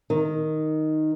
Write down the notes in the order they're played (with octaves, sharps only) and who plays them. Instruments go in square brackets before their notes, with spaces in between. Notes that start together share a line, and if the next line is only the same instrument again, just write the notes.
[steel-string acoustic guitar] D#3